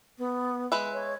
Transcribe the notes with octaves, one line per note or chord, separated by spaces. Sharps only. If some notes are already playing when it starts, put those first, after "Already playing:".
B3
G#3 B4 E5
C#5